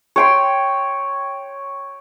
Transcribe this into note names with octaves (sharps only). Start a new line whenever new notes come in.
C#5 G5 C6